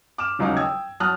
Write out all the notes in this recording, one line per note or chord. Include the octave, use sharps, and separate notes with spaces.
D6 F6 E7
D#1 C#2 F#3 D#4 F5 D6
G5 D#6 E6 G#6
F#3 A5 D#6 F6 F#6